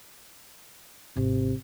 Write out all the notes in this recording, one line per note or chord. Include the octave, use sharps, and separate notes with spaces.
G#1 C3